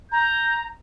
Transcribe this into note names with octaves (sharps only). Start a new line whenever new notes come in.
A#5 G6